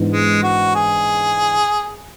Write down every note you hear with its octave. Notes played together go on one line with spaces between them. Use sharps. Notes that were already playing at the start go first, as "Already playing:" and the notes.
Already playing: G#2 E3 B3 D4
G#3
F#4
G#4